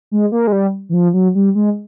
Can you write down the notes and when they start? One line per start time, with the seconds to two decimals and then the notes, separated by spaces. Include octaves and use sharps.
0.11 G#3
0.32 A#3
0.47 G#3
0.52 G3
0.89 E3
0.94 F3
1.14 F#3
1.35 G3
1.55 G#3